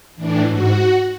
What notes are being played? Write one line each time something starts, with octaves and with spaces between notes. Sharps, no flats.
A2 E3 D4
G#2 F#4